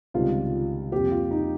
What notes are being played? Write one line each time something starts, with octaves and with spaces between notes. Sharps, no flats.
C#2 C3 D#3 G3 F4
F2 C3 G3 A#3 G4
F4
D#4